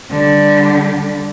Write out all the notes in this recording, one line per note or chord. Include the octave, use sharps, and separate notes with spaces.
D3 G3